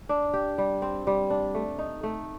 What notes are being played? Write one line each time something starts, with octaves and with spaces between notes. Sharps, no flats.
D4
G4
G3
C4
G3
D4
A3
D#4
A3